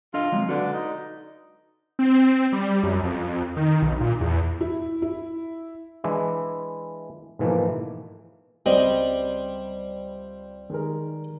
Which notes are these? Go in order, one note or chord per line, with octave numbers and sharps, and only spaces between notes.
D4 F4 A4 D#5
F#3 G#3 C4
D3 F#4 B4 D5
D#4
C4
G3
F#2
F2
D#3
B1
A#2
E2
E4
E4
E3 G#3 D4 E4
G#2 B2 E3 F3 A3 A#3
C#2 G3 C4 C5 D#5
D#3 G#3 A#4